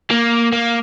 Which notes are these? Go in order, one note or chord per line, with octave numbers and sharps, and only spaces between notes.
A#3
A#3